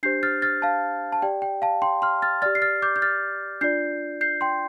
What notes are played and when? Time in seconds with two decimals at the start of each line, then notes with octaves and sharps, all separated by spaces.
0.03 D4 G4 C5 G6 C7
0.23 F6 A6
0.42 F6 A6
0.62 F5 A5
1.12 A5
1.22 G4 D5 G5
1.42 G5
1.62 F5 A5
1.82 G5 C6
2.02 C6 F6
2.22 F6 A6
2.42 D5 F6 A6
2.46 G4
2.55 C7
2.62 F6 A6
2.82 D6 G6
2.96 G6
3.02 F6 A6
3.61 D4 F4 D5 G6 C7
4.21 G6 C7
4.41 G5 C6